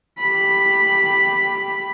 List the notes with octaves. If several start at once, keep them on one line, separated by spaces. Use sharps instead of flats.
G4 B5